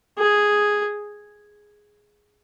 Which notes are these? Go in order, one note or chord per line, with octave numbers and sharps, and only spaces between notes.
G#4